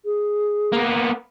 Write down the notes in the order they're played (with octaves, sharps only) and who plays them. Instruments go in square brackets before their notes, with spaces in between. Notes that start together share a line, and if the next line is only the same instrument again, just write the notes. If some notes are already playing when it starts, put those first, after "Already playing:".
[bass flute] G#4
[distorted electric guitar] A#3 B3